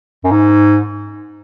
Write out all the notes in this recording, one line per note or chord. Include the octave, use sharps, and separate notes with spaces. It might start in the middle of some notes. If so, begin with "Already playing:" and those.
F#2
G#2